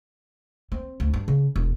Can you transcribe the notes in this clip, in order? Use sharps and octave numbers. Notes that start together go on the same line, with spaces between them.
C4
D2
G2
C#3
E1